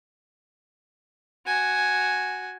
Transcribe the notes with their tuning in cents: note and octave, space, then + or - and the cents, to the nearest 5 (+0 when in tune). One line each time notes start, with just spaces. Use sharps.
F#4 +0 G#5 +0